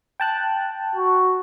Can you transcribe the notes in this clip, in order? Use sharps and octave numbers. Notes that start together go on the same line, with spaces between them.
G5 A5 F#6
F#4